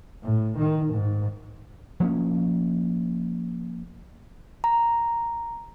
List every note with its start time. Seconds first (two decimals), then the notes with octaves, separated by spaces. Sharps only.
0.23 A2
0.58 D#3
0.93 G#2
2.00 F3 A#3 C#4
4.64 A#5